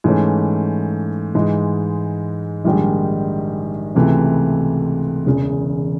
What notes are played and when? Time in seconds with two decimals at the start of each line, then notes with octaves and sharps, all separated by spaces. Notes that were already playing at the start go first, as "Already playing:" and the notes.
0.04 G#2 E3 A3 C#4
1.35 G#2 E3 G#3
2.65 A#1 G#2 D#3 G3
3.95 C#2 C3 E3 A3
5.26 E1 E2 C#3